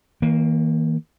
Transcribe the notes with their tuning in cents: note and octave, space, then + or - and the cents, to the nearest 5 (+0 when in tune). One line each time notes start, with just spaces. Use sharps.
E3 -45 A#3 +0